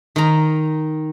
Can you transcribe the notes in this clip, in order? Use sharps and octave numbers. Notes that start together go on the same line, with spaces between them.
D#3 A#5